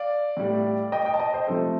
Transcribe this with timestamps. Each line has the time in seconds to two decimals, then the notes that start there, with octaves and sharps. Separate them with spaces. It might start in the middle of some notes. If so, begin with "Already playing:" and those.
Already playing: D5 F5
0.37 A2 G3
0.92 D#5 G5
1.05 D#5 G5
1.14 A5
1.20 D#5 G5
1.34 C5 D#5
1.47 C3 F3 A3 A4 C5